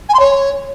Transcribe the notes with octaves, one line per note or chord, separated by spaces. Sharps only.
G#5
C6
C#5